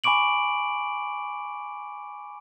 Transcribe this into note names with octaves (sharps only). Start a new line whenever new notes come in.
G#5 B5 C#6 D6 D7 F#7